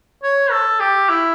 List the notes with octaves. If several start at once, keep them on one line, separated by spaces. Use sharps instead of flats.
C#5
A4
G4
E4